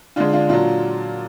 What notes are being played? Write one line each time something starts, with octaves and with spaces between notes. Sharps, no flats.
D3 G#3 D4 F4
D4 F4
A#2 F#3 D4 F4